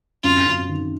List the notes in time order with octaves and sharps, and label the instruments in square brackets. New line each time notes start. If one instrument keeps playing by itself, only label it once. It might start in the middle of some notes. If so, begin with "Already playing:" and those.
[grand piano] F#2 [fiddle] F4
[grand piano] F#2
D#3